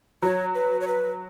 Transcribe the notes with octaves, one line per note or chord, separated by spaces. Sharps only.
F#3 C#5
B4
C#5
B4